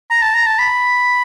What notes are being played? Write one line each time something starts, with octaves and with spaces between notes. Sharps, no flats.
A#5
A5
A#5
A5
B5